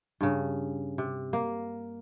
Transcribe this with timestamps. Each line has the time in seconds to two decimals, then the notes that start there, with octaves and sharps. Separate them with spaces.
0.21 G2 C#3
0.98 C3
1.33 A#3